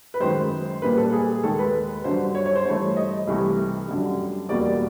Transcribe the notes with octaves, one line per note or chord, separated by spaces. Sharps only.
B4
F#2 D#3 G#3 C5
A#2 G3 A#3 B4
A4
G#4
D#2 D#3 G#3 A4
B4
G2 D3 F#3 C5
C#5
C#5
C5
G2 E3 A3 C#5
D#5
C2 C3 E3 A3
F#2 D3 G3
E2 B2 G3 A#3 D5